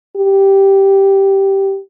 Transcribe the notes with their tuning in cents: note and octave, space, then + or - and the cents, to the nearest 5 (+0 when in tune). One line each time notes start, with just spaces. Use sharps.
G4 -5